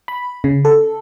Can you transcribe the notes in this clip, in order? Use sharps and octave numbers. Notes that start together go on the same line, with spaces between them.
B5
C#3
A4